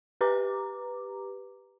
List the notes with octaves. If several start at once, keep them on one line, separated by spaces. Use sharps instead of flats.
G4 B4 A#5 D6